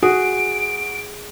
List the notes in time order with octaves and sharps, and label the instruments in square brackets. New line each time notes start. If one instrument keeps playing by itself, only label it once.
[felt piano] F#4 [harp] G#4 [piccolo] D7